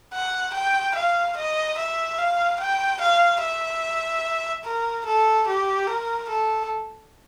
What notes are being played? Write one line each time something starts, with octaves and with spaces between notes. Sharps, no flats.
F#5
G5
F5
D#5
E5
F5
G5
F5
E5
A#4
A4
G4
A#4
A4